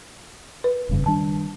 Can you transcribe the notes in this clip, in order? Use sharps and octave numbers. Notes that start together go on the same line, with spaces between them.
B4
F1 G2 C#3
D#3 G3 D4 A5